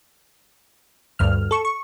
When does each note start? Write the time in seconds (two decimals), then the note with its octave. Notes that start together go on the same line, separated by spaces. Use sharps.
1.19 D2 G2 F6
1.51 A4 C#6
1.65 C#6